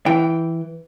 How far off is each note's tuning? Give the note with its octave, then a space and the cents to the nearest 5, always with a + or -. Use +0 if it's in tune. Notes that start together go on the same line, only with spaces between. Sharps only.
E3 +0 G5 +0